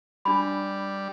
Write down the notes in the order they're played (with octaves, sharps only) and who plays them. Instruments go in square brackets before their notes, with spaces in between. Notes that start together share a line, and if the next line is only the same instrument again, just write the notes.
[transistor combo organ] G3 [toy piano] D4 B5